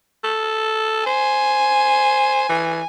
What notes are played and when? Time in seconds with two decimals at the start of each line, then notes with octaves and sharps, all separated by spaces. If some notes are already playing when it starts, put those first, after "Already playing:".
0.24 A4
1.06 C5 G#5
2.49 E3